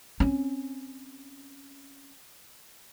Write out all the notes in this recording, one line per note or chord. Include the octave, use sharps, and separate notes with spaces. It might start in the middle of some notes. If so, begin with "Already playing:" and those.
C4 C#4